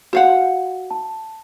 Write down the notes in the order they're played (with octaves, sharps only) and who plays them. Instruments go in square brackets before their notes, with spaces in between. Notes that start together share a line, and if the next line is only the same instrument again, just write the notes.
[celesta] F#4 [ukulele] C5 F5 F#5
[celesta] A5